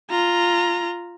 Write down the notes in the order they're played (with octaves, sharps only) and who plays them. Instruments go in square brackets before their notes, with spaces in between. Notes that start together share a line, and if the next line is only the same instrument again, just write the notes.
[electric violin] F4 A#5